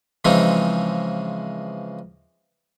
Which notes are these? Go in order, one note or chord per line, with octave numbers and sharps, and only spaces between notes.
C#3 E3 F3 G#3 C4 D#4